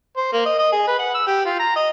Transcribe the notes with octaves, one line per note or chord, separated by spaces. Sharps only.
C5
A#3
D#5
D#5
G#4
B4
F#5
E6
G4
F4
A#5
D#5